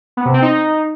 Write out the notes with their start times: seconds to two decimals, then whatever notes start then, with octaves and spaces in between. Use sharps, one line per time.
0.17 B3
0.25 C3
0.34 C4
0.42 D#4